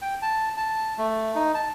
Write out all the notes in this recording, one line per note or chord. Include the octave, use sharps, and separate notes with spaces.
G5
A5
A5
A3
D#4
A5